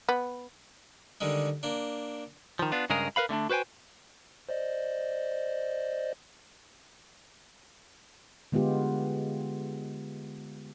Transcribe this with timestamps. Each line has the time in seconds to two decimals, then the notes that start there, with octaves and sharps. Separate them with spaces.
0.09 B3
1.21 D3 D#3 G3 G#3
1.63 A#3 D4
2.59 D#3 F3
2.72 B3 D4 F4
2.90 G2 C#3 G#3 G#4 A#4
3.16 A#4 B4 F5 B5
3.29 D3 A3 C#4 D4
3.50 F#4 B4 C5 G5 G#5
4.49 C5 D5 D#5
8.52 D3 G#3 B3 F4 G4